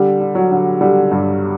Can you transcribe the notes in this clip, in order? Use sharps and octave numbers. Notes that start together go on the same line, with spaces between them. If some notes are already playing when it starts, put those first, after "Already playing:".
Already playing: D3 G3
D3
F#3
D3
D3 G3
G2